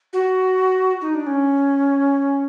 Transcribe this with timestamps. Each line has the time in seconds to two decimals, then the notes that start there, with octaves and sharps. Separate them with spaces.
0.13 F#4
1.02 D#4
1.15 D4
1.27 C#4